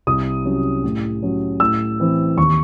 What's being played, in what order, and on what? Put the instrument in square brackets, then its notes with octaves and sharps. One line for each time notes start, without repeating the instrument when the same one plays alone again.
[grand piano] C2 D#6
C3 F#3 C#4
A2
F#3 C#4
A2 E6
E3 C4
D#2 C#6